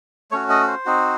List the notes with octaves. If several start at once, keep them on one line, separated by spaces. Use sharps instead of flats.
A3 C#4 F#4 C#5
D#5
C5
C4 D#4 F#4